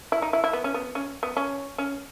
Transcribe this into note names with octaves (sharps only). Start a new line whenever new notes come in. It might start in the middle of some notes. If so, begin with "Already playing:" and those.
E4
D#4
E4
E4
B3
C#4
B3
C#4
B3
C#4
C#4